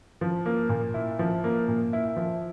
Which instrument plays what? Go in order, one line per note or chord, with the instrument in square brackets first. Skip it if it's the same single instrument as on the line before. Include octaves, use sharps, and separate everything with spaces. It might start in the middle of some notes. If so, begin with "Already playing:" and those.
[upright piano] F3
A#3
A#2
E4
F3
A#3
A#2
E4
F3